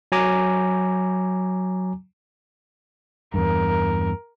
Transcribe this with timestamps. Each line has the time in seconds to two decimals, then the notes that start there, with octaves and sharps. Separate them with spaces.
0.12 F#3 G#5 A#5 D6
3.34 E2 G2 A#4